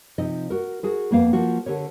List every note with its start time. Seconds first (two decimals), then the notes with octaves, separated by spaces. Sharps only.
0.18 C3 F3 D#4 D#5
0.50 F#4 A#4
0.83 F#4 G#4 A#4
1.11 F2 A#3 B3 F5
1.33 F3 A#3 F#4
1.66 D3 G4 A#4 C#5